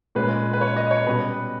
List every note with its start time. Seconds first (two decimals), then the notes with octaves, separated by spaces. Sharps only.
0.15 A#2 G#3 C#4 B4
0.53 B4
0.61 C#5
0.76 D#5
0.91 C#5
1.06 B2 G3 C#4 B4